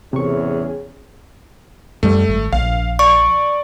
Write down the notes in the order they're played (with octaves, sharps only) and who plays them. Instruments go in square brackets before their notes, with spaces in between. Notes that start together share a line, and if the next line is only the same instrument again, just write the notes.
[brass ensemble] E2 A2 [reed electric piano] C3 C#6 [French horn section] C#4 G#4
[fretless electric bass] F#2 G3 [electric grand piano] A3
[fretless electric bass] G#1
[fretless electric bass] A#1 [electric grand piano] F5
[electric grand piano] D5 [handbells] C#6